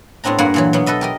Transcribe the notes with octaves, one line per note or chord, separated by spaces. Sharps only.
A2 B3 C4 D4 A#5
G2 A#3 B4 F#5 G#5 B5
A#2 E3 F#3
B2 F#3 B3
A4 B4 D#5 E5
G4 A#4 D#5